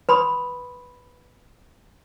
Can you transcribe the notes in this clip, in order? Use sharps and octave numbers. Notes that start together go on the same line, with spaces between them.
B4 B5 C6 D#6